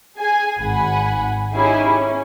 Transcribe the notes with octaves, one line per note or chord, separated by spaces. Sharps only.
G#4 G#5
G#1 F#5 G#5 B5
C#4 D#4 E4 G4 G#4 G#5
C#4